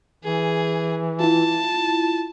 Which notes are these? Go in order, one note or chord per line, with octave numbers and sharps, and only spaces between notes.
E3 G#4
E4 F4 A5